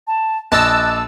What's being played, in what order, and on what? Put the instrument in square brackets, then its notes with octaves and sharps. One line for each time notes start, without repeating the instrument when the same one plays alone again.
[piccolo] A5
[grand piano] A#1 [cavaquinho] D5 D#5 [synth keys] A5 E6 [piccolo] F#6